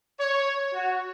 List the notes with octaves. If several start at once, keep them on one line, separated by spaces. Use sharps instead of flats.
C#5
F#4